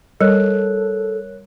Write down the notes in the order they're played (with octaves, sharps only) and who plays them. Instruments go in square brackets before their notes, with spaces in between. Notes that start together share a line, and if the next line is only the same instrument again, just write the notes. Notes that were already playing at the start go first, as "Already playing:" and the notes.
[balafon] G3 [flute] A4 [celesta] A#4 C#5 F#6